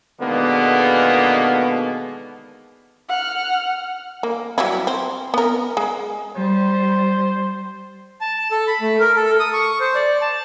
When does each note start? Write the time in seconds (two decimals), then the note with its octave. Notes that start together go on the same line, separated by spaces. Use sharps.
0.20 B2 D3 D#3 G#3 A#3 B3
3.09 F#5 F6
4.23 A#3
4.58 F#3 G3 E4
4.87 C4
5.34 B3 A#4
5.77 G#3
6.36 G3 C5
8.21 A5
8.51 A4
8.67 B5
8.81 A3
9.00 A#4
9.16 A4
9.40 D#6
9.53 C#6
9.80 C5
9.95 D5
10.21 A5